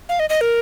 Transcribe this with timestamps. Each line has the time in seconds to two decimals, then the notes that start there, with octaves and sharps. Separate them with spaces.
0.09 F5
0.20 D#5
0.30 D#5
0.41 A#4